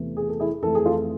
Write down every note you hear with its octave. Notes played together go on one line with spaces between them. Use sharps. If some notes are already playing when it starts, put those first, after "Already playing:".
Already playing: E2 C3 E3 A3
G#4
A4
E4 G#4
F2 E3 A3 A4
G#4
F4 A4